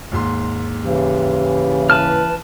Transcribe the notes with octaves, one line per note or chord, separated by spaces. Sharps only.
D#2 G#2 C6
C#3 E3 G4
B4 A5 F6